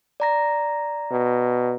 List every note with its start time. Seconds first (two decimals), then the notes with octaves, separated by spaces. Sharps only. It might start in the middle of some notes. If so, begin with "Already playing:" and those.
0.20 D5 A#5 A#6
1.11 B2